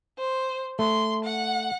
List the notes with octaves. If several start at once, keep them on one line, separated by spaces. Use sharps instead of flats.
C5
A3 C6
F#5